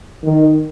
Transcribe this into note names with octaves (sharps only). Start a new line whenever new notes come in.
D#3